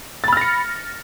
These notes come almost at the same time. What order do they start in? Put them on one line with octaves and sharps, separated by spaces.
A6 B5 F6 A#6 C#7